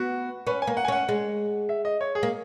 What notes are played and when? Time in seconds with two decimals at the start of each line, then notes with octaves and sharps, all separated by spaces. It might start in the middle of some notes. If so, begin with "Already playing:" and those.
Already playing: B3 F#4
0.47 C#4 B4
0.62 G#5
0.67 A#3
0.77 F#5
0.85 G#5
0.88 C#4 F#5
1.09 G#3
1.69 E5
1.85 D#5
2.01 C#5
2.15 G#4
2.23 A#3